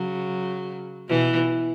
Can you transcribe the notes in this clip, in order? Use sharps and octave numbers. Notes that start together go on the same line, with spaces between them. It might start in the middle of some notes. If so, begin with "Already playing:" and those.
Already playing: C#3 F#3
B2 E3